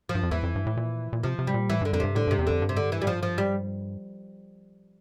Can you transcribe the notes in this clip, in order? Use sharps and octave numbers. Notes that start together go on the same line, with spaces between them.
F3
G2
F2
E2 E3
F2
G2
A2
A#2
A#2
C3 F3
C3
G3
A#2
A2 E3
G2 D3
F2 D3
G2 C3
A2 D3
G2 C3
E2
F2 D3
G2
C3
D3
E3
G3
F3
F3
G3